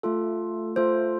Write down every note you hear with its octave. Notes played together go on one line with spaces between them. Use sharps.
A3 F4 A4
A3 F4 A4 C5